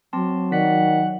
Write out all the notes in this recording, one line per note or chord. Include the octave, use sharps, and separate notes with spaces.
F#3 C4 A5 C6
D#3 D5 F#5 B6